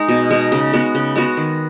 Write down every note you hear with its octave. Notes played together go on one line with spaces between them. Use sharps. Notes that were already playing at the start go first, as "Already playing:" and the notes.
Already playing: G#3 D#4
B2
G#3 D#4
C#3
G#3 B3 F#4
C#3
G#3 B3 F#4
D#3